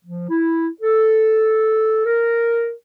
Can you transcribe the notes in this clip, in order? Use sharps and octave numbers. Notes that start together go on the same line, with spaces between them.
F3
E4
A4
A#4